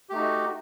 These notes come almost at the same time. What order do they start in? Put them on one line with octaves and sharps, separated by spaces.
G4 A3 D#4 F#4